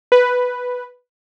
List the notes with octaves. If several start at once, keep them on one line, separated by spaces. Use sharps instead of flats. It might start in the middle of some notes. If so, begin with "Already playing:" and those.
B4